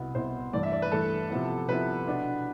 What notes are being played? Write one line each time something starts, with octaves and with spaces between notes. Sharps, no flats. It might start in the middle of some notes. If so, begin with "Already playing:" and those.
Already playing: C2 B2 B3 E4
C2 B2 B3 E4 C5
G2 E3 A3 D5
E5
D5
B4
G2 E3 A3 A4
C3 F3 B3 E4
C3 F3 B3 E4 B4
B2 B3 D4